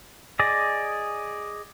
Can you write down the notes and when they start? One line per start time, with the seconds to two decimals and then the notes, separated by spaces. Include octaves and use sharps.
0.39 G#4 D5 D#5